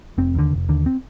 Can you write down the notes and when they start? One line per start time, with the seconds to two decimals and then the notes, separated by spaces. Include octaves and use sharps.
0.18 F1 C4
0.35 D#2 D3
0.51 F1
0.69 D#2 D3
0.86 C4